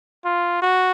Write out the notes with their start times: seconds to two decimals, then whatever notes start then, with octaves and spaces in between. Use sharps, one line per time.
0.25 F4
0.62 F#4